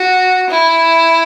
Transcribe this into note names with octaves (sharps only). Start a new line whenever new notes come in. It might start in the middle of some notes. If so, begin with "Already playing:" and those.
Already playing: F#4
E4